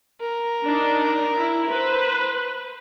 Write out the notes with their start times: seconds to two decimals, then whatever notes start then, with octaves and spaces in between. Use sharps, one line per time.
0.21 A#4
0.64 D4 D#4
1.35 E4
1.69 B4 C5